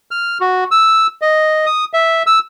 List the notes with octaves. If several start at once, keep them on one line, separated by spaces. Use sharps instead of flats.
F6
F#4
E6
D#5
D#6
E5
E6